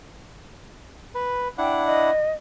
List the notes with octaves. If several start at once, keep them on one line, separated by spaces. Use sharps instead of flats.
B4
D4 E4 F#5 G5
D#5